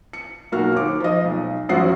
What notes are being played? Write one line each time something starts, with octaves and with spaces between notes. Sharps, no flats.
C#7
B1 A#3 F#4 F6
D#2 D6
F3 D#5
B1
A1 F#2 F3 F#4 F#5 C7